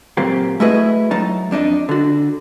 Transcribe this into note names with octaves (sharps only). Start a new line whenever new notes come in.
A#2 F#3 A#3 C4 G4
A3 E4 F#4 G#4 B4 D#5
F#3 D#4 A5
F2 D4 D#4 D#5
D3 F#4